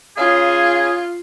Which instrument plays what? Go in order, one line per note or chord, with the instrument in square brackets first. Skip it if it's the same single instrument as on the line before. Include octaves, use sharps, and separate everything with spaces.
[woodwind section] C#3 G#4 [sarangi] F4